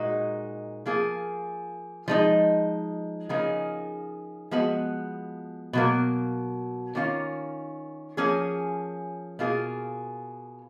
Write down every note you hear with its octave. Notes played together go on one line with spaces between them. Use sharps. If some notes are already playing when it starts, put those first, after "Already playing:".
Already playing: A#2 G#3 D#4 F#4
F3 A#3 F4 G#4
F3 G#3 D#4
C#3 F3 A#3 D#4 G#4
F3 G#3 B3 F#4
B2 F#3 A#3
D#3 A#3 C#4 F4
F3 A#3 C#4 G#4
B2 A#3 F4 G#4